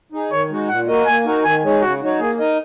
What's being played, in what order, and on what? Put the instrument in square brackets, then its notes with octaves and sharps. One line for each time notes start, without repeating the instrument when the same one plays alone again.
[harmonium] D#4 G#4
[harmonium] D#3 [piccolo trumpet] C#5
[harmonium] G#3 D#4 F#4
[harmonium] A#2 [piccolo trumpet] F#5
[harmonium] A#3 F#4 A#4 D#5
[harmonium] A#3 [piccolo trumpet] G#5
[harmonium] D#4 F#4 A#4
[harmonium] D#3 [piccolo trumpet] G#5
[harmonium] G#3 D#4 G#4 C#5
[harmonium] C#3 [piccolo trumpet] F#4
[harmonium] F#3 D#4 F#4 C#5
[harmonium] A#3 [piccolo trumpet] G#4
[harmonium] D#4 A#4 D#5